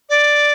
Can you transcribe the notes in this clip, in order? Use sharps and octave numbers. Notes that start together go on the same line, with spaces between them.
D5